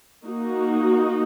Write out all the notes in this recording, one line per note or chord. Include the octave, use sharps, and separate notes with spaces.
A#3 D#4 F#4